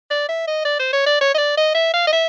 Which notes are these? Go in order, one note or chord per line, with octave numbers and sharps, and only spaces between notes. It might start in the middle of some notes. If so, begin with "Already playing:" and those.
D5
E5
D#5
D5
C5
C#5
D5
C#5
D#5
D5
D#5
E5
F5
D#5
E5